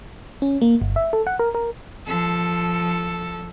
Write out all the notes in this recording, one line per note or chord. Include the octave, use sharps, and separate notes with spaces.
C#4
A#3
G1
E5
A4
F#5
A#4
A#4
F3 A4